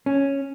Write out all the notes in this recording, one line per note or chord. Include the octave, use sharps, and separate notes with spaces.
C#4